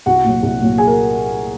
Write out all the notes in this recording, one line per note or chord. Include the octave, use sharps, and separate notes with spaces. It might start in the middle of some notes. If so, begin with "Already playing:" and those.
C2 F#4 F#5
A#2 F#3
C2
A#2 F#3
G#4 G#5
A#4